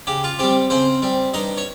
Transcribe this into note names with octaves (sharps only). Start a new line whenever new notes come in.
C#3 G4
F4
G3 C4 G4
C#3 C4 C5
G3 C4
G2 D#4 D#5
C#5